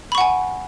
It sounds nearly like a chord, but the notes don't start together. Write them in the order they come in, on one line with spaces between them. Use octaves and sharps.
B5 C#6 F#5 G#5